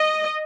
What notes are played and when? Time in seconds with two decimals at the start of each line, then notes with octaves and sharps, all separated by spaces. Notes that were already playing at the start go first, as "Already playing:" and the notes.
Already playing: D#5